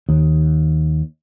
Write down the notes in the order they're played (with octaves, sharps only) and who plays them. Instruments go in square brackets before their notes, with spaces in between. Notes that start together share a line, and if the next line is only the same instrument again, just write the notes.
[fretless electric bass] D#2